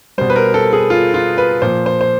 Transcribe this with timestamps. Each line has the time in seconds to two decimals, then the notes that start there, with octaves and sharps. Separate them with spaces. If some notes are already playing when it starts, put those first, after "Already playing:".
0.18 B2 G3 C5
0.30 B4
0.36 A#4
0.54 A4
0.73 G#4
0.90 F4
1.14 F4
1.38 B4
1.62 A#2 F3 C5
1.86 C5
2.01 C5